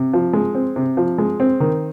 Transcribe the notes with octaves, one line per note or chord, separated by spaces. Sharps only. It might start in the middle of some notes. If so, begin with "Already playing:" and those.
Already playing: C3
F3
G#3
C4
C3
F3
G#3
C4
D#3